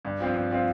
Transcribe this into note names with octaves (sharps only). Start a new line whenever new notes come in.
G2
F3 C4 F4
G2
F3 C4 F4